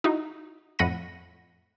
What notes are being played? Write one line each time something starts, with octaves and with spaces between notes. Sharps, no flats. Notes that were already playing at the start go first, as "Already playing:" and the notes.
D#4 E4 F#4
F2 A2 F#5 B5 A#6 D#7